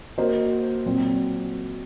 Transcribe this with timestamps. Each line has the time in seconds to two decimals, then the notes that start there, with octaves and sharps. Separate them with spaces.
0.18 A#3 F#4 C5 D#5
0.86 A#2 F#3 C4